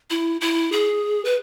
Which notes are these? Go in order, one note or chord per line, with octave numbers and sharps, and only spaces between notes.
E4
E4
G#4
B4